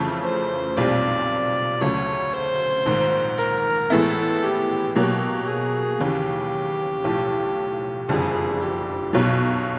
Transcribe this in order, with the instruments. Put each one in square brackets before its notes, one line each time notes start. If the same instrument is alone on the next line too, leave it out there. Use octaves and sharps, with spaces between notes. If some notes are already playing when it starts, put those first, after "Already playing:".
Already playing: [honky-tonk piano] F2 C#3 E3 A3
[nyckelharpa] C5
[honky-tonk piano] B1 A#2 G3 C4 [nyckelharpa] D5
[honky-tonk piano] D2 C#3 F#3 A3 [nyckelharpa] C#5
[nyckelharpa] C5
[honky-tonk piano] A#1 G#2 D#3
[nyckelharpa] A#4
[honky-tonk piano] A2 E3 G#3 B3 E4 [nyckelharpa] A4
[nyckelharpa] G4
[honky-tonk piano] B2 F#3 A#3 [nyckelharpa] G4
[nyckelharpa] G#4
[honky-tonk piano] D#2 C#3 E3 [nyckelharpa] G4
[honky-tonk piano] B1 A2 F3
[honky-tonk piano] F#1 F2 D3 G3 [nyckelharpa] G#4
[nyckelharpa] G4
[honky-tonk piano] B1 B2 F#3